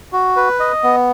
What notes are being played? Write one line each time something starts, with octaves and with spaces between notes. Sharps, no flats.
F#4
B4
D#5
B3